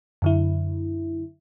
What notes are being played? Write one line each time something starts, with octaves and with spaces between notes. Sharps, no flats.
F#2 D3 E4